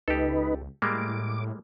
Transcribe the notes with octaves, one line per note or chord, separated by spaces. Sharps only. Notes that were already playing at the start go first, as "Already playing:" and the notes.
C#2 D#4 G4 A4 B4
A2 G3 G#3 A#3 D6